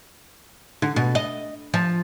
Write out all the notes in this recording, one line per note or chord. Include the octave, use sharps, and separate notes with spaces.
D3
B2
D#5
F3